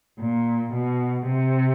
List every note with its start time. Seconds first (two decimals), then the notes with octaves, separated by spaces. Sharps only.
0.19 A#2
0.73 B2
1.26 C3